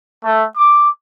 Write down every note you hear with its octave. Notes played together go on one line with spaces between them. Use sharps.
A3
D6